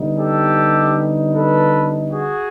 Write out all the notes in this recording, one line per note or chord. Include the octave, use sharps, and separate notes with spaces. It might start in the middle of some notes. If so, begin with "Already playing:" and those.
Already playing: D3 G3 B3 D#4
G4 A4
A4 B4
F#4 G#4